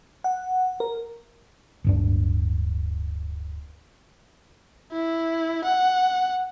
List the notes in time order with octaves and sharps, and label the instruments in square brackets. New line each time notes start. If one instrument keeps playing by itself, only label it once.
[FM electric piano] F#5
A#4
[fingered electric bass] D1 G2 D4
[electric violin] E4
F#5